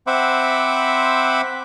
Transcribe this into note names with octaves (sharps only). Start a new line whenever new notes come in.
C4 C5 E5 F#5 B5 D6